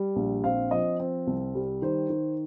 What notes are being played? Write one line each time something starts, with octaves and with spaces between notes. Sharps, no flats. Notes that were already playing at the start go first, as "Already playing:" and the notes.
Already playing: G3
A#1
C4 F5
F3 D#5
C4
C2
G3
D#3 C5
D#3